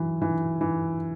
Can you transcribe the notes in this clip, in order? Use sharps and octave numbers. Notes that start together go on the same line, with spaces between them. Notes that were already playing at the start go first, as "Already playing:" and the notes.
Already playing: E3 F#3
E3
E3